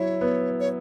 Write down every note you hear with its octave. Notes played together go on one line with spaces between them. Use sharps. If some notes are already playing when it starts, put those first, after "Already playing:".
Already playing: F#3 E4 C#5
B3
C#5